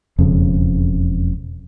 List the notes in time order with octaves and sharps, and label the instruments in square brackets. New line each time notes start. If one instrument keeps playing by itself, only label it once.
[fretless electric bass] E1 F2 C#3